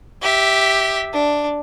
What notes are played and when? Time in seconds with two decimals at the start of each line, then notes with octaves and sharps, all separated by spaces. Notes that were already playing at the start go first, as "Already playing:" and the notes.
0.22 G4 E5
1.14 D4